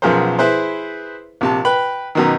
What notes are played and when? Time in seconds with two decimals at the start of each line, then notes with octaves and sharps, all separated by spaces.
0.02 B1 F#2 F3 G#4 A#4 C5
0.39 E4 G#4 B4 C5
1.41 A#1 C3 A5
1.65 B4 G5 B5
2.15 F#2 B2 D#3